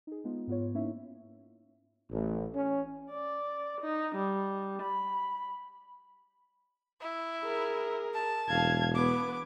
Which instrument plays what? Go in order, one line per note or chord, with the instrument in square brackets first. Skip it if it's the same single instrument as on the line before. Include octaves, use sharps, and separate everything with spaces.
[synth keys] D#4 G#4
G#3 B3 D#4 F4
G#2 B3 F4 C#5
A#3 C#4 D#4 E4 C#5 E5
[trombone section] A1
C#4
[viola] D5
D#4
G3
B5
[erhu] E4
[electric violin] G#4 A#4
[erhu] A5
[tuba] E1 [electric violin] F5 G#6
[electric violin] B3 B4 [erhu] D6